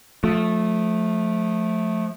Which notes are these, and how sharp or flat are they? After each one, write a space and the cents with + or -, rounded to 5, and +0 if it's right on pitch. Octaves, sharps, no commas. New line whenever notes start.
F3 +25 A3 -10